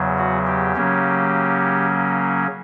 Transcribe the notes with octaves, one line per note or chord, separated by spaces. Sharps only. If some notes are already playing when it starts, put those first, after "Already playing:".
Already playing: E2 C#3 F#3
F#4
G4
C#3 F#3 A#3 C#4